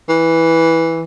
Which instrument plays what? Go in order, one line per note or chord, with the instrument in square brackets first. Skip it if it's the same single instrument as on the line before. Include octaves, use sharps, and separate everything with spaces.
[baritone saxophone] E3